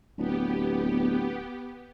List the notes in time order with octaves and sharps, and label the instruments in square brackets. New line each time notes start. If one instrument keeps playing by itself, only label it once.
[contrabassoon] D1 [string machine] B3 G4